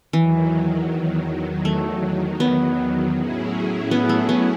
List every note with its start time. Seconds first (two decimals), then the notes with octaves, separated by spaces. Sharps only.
0.13 E2 D#3 E3 F#3
1.65 A3
2.40 B3
3.15 A2 F#3 C#4 E4 G#4
3.91 B3
4.09 A3
4.29 B3